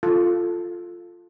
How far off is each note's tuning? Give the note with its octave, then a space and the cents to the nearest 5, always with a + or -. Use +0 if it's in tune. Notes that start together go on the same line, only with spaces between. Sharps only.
F4 +0 A4 +0